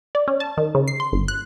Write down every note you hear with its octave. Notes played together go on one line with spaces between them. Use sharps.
D5
C#4
A5
D#3
C#3
C7
C6
G1
F#6